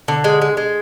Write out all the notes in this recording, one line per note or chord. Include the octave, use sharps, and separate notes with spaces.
D3
G#3
G#3
G#3